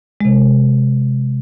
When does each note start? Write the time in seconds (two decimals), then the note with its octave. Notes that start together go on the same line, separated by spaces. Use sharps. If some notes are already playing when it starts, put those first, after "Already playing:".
0.21 C3 G#3